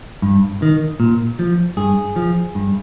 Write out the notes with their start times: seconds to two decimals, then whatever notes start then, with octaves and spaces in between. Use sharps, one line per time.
0.22 G2
0.62 D#3
1.00 A#2
1.39 F3
1.77 G2 G#4
2.16 F3
2.55 G2